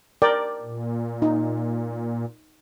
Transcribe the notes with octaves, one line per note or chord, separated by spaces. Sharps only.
A#4 D5 G5
A#2
D#4